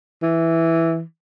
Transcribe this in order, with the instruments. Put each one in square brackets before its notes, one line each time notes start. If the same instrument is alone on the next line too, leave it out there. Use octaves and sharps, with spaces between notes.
[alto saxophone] E3